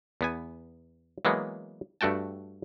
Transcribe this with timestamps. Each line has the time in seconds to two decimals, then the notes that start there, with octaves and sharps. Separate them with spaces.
0.21 E2 B3 G#5
1.25 E3 F#3 G#3 A#3 B3
2.01 G2 A3 F#4 G5 A5